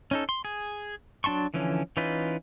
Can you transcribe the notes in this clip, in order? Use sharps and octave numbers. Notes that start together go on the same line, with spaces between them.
C#4 D#4 A4
C6
G#4
F#3 D4 A5 C6 C#6
D3 E3 F3 C#4
E3 C#4 D#4 F4 B4